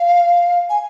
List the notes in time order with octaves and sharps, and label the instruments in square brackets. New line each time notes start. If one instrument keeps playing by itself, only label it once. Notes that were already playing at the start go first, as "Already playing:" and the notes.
Already playing: [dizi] F5
G#5